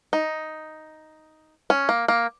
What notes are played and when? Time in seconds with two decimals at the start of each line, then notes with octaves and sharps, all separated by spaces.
0.13 D#4
1.70 C#4
1.89 A#3
2.08 A#3